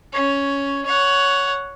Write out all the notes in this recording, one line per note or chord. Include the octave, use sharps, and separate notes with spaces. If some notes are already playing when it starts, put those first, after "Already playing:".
C#4 C#5
C#5 F#5